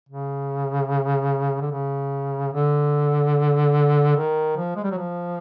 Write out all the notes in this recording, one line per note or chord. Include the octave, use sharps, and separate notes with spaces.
C#3
D3
C#3
D3
D#3
F3
G#3
G3
F#3
F3